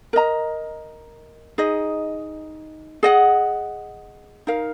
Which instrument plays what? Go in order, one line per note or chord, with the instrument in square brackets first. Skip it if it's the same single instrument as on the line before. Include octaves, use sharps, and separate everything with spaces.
[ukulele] A#4 D#5 A#5
D#4 G#4 D#5
G#4 D#5 F#5
D#4 A#4 F5